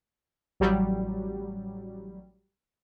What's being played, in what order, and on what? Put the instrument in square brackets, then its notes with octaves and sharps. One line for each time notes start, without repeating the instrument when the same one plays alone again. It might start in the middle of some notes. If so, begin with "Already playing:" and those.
[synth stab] A1 F#3 G3